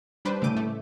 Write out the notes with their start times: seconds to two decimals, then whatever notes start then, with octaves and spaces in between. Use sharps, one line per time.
0.25 G3 D4 B4 C5
0.41 A2 C#3 A3 D6 G6 D#7
0.56 A3